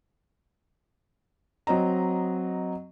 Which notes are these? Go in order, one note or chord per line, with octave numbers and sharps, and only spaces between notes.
F#3 C4 D#5 A#5